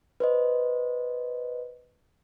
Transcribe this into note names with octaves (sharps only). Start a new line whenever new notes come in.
B4 C5 D#5